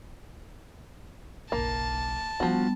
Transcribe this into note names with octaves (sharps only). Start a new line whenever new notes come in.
F#1 B1 A#3 A5
F3 G3 B3 C#4 D4 F#4